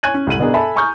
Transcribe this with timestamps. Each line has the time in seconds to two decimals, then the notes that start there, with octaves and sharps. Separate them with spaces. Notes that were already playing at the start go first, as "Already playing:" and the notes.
0.03 C#5 G#5 F#6 G#6 D#7 F#7
0.14 C#4
0.27 C2 A2 A3 D#7 F#7
0.39 B2 B3 D4 G#4 A#4
0.54 A4 E5 G#5 A5 B5
0.76 G#5 A#5 C#6 D#6 F6 G6